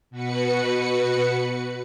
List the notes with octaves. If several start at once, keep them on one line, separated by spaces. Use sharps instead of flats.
B2 F#4 B4 C#7